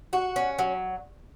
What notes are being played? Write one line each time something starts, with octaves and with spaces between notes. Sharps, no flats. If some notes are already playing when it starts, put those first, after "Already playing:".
F#4
C#4
F#3